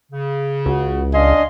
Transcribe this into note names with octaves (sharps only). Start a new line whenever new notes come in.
C#3
C#2 F#4
D4 D#5 F5 G#5 C6